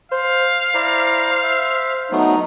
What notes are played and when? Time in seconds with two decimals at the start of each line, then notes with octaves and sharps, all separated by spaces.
0.12 C5 F5
0.74 E4 C5 D5 A#5
1.43 E5
2.12 F#3 A3 B3 D#4